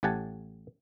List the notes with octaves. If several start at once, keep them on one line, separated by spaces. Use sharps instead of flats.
A1 A2 G4 F#5 G#5 A5